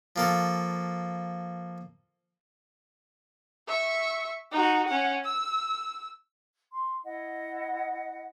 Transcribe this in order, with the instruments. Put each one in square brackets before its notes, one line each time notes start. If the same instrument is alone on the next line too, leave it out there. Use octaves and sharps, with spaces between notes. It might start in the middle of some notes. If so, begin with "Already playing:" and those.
[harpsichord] F3 A#3 A4
[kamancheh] E5 C#6
D#4 F#4
C#4 F#5
E6
[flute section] C6
E4 D#5 F#5